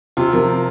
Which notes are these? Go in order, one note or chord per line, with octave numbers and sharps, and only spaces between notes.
C3 F4
F3 A#4